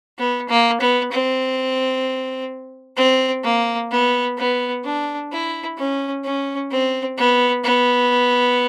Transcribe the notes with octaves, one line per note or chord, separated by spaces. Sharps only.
B3
A#3
B3
C4
C4
A#3
B3
B3
D4
E4
C#4
C#4
C4
B3
B3